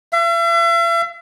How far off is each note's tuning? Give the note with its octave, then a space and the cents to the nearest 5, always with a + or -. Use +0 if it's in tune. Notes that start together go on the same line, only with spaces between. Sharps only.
E5 +45